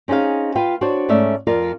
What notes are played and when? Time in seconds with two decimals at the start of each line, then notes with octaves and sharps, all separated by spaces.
0.08 C4 C#4 D#4 G#4 F5
0.55 F4 B4 F5 G5
0.81 D4 F#4 C5 C#5
1.09 G#2 A3 C#4 D5 E5
1.47 F2 F4 A#4 D5